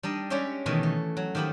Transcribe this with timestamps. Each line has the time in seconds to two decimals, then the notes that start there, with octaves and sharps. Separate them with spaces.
0.03 G3 D4 D#4 D#5
0.30 G#3 C#4 C#5 D5 E5 G5
0.66 B2 D#3 E3 A3
0.83 A3
1.17 F#3
1.35 D#3 F3 G4 E5 B5